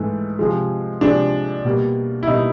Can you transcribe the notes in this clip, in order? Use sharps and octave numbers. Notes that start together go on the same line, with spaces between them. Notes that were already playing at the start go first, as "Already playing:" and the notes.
Already playing: G#2 E3 A3
C3 F3 G#3
C3 F3 G#3 D4
B2 G3 A#3
E4
B2 G3 A#3 D#4